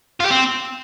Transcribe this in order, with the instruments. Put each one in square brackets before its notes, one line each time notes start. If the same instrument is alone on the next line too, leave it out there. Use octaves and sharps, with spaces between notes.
[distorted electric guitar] F4
G4
C4